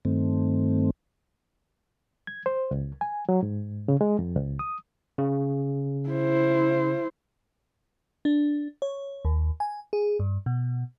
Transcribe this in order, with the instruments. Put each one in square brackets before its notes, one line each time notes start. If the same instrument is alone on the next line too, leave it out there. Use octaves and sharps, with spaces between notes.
[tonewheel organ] G2 D#3 A3 C4
[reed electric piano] G#6
C5
C#2
G#5
F#3
G#2
C#3
G#3
F2
C#2
D#6
[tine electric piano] C#3
[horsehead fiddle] E4 C5
[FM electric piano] D4
C#5
D#2
G#5
G#4
G2
B2